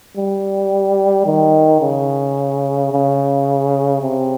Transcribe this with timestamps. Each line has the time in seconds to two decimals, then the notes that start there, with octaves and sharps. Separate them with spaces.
0.17 G3
1.26 D#3
1.81 C#3
2.92 C#3
4.02 C3